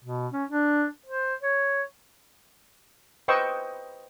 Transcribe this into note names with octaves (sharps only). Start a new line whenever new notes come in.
B2
C#4
D4
C5
C#5
B4 C5 D#5 G5 C#6 E6